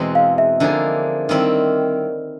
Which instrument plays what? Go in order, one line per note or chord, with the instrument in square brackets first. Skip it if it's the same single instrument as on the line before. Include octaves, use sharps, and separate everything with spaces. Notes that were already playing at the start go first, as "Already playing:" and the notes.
Already playing: [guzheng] E2 B2 G#3 C4
[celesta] F5
E5
[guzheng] D3 F3 A#3 D#4 G#4
D#3 G3 C4 E4